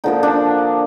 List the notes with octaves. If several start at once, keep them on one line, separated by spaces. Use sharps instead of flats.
D3 F3 A#3 D#4
D4